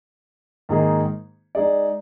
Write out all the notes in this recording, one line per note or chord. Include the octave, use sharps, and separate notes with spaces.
G#2 D#3 A#3 D#4 G#4
G#3 D#4 G#4 D5